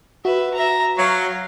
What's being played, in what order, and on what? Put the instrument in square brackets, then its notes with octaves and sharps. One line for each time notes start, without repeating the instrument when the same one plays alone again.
[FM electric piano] F#4 [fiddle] B4 E5
[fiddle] E5 A#5
[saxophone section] F#3 [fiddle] F5